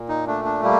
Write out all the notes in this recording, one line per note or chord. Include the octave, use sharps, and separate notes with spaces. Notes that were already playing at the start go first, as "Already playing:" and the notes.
Already playing: A#2
D#4
A3 D4
D4
G3 A#3